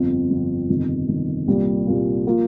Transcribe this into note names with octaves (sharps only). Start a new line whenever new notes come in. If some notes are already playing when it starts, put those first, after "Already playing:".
Already playing: G1 F2 F3 C4 F4
G1 F2 F3 C4 F4
G1 F2 C3 D#3
G1 F2 C3 D#3
C2 A#2 G3 A#3 F4
C2 A#2 G3 A#3 F4
F3 A#3 F4